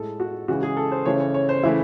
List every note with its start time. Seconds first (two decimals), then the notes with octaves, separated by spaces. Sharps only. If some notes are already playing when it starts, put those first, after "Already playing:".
Already playing: A2 G#3 A4
0.20 F#4
0.48 C#3 E3 G#3 F#4
0.63 G#4
0.77 A4
0.92 C5
1.05 C#3 E3 A3 C#5
1.20 C#5
1.34 C#5
1.49 C5
1.63 C#3 E3 A3 E4